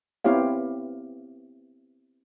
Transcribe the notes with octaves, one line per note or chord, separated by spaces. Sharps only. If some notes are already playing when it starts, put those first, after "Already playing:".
B3 C4 E4 G4 C#5 F5